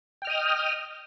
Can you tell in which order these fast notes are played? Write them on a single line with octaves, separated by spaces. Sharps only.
G5 F6 D#5 D#6